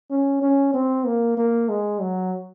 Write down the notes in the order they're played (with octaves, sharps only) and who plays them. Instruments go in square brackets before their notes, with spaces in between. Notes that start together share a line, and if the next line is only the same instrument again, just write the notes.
[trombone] C#4
C#4
C4
A#3
A#3
G#3
F#3